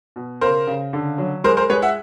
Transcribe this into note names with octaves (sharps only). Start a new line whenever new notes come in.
B2
C#3 A#4 C5
C#3
D3
F#3
G#3 A#4 C5
A#4 C5
G#3 B4 C#5
E5 F#5